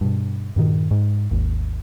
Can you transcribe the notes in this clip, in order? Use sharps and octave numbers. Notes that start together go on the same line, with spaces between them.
G2 B2
G2 A#2 D#3
G#2
G#1 D#2